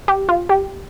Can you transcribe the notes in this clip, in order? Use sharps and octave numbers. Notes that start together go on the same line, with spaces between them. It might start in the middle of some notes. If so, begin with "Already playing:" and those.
G4
F4
G4